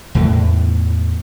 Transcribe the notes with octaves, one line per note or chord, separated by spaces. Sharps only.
E2 A2 D3 D#3